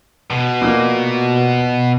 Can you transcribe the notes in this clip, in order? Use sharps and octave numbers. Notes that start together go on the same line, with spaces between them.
B2
A#2 A#3